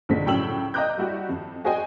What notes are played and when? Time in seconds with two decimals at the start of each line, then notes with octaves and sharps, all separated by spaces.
0.09 A#1 D3 G#3 C4 B6
0.25 C#2 A2 F#3 G5 E6 F#7
0.74 D#5 G5 A#5 D6 F#6 G6
0.98 G3 E4 F#4 G4 D5
1.29 F2
1.64 F#4 G#4 C5 D#5 G5 G#5